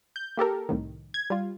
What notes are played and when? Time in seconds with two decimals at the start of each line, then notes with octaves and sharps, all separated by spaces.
0.16 G6
0.37 A#3 G4 A4 A#4
0.69 C2 A2 D#3
1.14 G#6
1.30 G3 F4